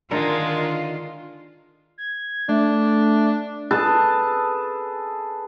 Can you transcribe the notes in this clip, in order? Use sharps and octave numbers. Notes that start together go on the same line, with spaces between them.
D3 D#3 G#3 F4 A4 A#4
G#6
A3 D4
G#4 A4 B4 A5